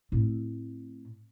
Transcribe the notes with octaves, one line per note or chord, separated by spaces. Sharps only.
A2 C4